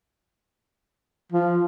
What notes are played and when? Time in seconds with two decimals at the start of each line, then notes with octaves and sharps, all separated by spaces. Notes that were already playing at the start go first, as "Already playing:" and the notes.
1.32 F3